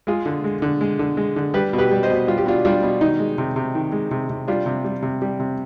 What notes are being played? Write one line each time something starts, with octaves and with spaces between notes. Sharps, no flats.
G#3 F4 G#4
D3
G#3
D3
G#3
D3
G#3
D3
G3 G4 B4
B2
G4 B4
G3
C5 D#5
B2
G3 F4
G4
B2 D4 F4
G3 D4 F4
B2
D#3 D#4
G#3
C3
C3
D#3
G#3
C3
C3
G3 D4 F4
C3
G3
C3
G3
C3